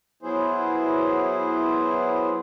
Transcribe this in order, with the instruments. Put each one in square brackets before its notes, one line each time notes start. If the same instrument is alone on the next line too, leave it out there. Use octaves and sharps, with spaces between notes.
[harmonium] F#3 B3 E4 G#4 C5